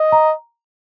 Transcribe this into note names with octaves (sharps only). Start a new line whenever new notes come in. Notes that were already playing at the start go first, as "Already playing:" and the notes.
Already playing: D#5
A#5